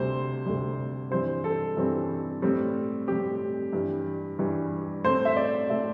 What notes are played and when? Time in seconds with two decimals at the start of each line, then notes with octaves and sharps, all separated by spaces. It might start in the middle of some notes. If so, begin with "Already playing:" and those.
Already playing: D2 C3 G3 C5
0.46 D2 C3 G3
1.11 G2 E3 G3 C4 C5
1.44 A4
1.76 G2 E3 G3 C4
2.42 A2 G3 C4
3.08 A2 G3 C4 G4
3.73 G2 E3 G3
4.39 G2 E3 G3
5.04 A2 A3 C4 C5
5.25 E5
5.37 D5
5.69 A2 A3 C4 E5